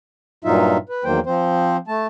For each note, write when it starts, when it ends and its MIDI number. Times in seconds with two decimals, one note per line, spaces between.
0.45 0.77 43
0.45 0.77 46
0.45 0.77 54
0.45 0.77 63
0.45 0.77 65
0.45 0.77 76
0.89 1.04 71
1.04 1.20 40
1.04 1.20 51
1.04 1.20 54
1.04 1.20 58
1.04 1.20 72
1.04 1.20 79
1.26 1.77 53
1.26 1.77 60
1.26 1.77 72
1.88 2.07 57
1.88 2.07 81